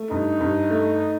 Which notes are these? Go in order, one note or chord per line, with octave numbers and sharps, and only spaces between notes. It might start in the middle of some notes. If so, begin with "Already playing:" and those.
Already playing: A3
G2 D#4
G2
A3